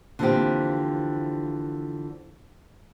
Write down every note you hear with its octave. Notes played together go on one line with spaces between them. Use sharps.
D3 E3 F3 A#3 C4 G4